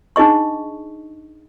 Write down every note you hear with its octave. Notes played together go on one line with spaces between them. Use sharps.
D4 D#4 G#4 D#5 C#6